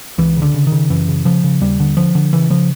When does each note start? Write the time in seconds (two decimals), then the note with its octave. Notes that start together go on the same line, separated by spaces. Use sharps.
0.18 C#2 E3
0.36 C#3
0.42 D3
0.54 C#3
0.67 D#3
0.72 C#3
0.90 F#2 E3
1.08 C#3
1.25 C#3 F3
1.44 C#3
1.61 D#2 G3
1.80 D3
1.97 D3 F3
2.15 D3
2.33 C#3 E3
2.50 C#3 F3